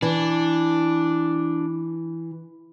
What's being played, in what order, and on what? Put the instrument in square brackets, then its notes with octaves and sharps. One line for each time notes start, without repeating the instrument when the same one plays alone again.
[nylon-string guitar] E3 [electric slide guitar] D4